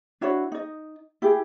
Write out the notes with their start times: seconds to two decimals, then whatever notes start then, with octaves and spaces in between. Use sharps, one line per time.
0.21 D4 E4 F#4 C#5
0.52 D#4 D#5
1.22 E4 G4 G#4